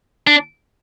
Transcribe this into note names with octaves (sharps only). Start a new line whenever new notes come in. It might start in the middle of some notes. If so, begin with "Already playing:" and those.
D4